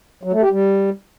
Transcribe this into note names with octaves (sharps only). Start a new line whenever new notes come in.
F#3
A3
G4
G3